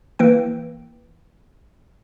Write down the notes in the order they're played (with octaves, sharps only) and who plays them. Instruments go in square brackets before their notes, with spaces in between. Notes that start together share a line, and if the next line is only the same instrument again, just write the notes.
[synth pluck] E3 A#3 G5